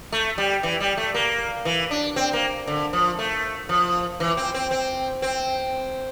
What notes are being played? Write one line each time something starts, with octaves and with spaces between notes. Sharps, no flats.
A3
G3
E3
G3
A3
A#3
E3
D4
C4
A#3
D3
F3
A3
F3
E3
C4
C4
C4
C4